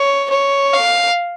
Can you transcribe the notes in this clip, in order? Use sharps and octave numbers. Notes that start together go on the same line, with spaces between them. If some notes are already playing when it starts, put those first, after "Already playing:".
Already playing: C#5
C#5
F5